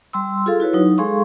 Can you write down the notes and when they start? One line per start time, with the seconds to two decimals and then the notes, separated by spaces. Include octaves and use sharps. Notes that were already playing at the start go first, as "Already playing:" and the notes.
0.13 G3 C6 E6
0.46 F4 G#4 A4 F5
0.60 E4 F#4 B4 C#5
0.74 F#3 D#4
0.98 G#3 G#4 A4 F5 C6 C#6